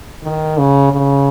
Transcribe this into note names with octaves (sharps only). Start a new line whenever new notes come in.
D#3
C#3
C#3